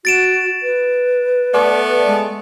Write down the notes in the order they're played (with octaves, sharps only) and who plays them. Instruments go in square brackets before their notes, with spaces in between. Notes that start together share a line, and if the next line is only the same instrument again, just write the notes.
[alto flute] F#4 [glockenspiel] A6 D7 E7
[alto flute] B4
[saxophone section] A3 B3 D5
[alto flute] G#3